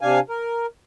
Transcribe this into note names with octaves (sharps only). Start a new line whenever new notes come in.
C3 D4 F5 G#5
A#4